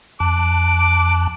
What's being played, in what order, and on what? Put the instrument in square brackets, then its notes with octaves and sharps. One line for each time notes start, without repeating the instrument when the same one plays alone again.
[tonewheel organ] F2 A5 F#6 [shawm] D6